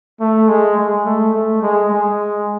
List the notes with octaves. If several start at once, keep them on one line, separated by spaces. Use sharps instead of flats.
A3
G#3
G#3
A3
A3
G#3
G#3